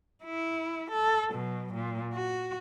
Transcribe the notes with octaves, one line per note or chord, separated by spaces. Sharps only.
E4
A4
B2 F#3
A#2
F#4